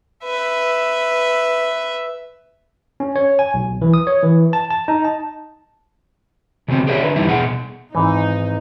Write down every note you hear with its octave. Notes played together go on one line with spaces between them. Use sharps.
B4 E5
C#4
C#5
G#5
B1
E3
D#6
C#5
E3
A5
A5
D#4
A5
C#3 F#3 B3 C4
G4 G#4 A#4 C#5 D5 E5
D3 B4
E2 G3 D#4 E4
B2 G#4 F#5
G#1 G#2 E3 D#4